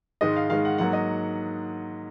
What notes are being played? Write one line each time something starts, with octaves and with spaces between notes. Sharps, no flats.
G#2 D#3 G#3 D#5
F5
G#2 D#3 G#3 F5
F#5
G#2 F#3 A#3 F#5
D#5